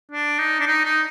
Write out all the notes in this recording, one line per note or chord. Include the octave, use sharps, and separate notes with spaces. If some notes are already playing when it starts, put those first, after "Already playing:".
D4
D#4
D4
D#4
D#4